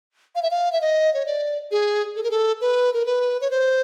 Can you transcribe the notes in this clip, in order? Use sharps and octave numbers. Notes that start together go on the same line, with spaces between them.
F5
E5
F5
E5
D#5
C#5
D5
G#4
A4
A#4
A4
B4
A#4
B4
C#5
C5